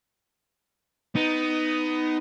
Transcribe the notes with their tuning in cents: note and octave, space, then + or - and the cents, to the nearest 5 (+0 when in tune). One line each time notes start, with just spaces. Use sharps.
B3 +20 D#4 +0